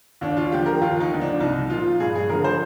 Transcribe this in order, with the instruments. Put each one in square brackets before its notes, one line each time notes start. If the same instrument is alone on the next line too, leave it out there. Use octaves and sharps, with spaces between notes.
[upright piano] D#2 D4
F4
D3 F3 G4
A#4
D#2 F4
D#4
D3 F3
D4
C2 D#4
A#2 F3 F4
G2 G#4
G#4
D3 F3 A#4
C5